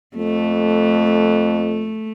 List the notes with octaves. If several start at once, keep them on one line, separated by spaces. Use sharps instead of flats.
F2 A3